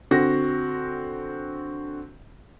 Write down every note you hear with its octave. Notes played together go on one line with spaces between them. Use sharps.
D3 C4 F#4 A#6